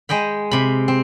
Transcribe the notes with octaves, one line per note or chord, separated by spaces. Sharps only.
G#3 D#5 G5 B5
C3 B5
C4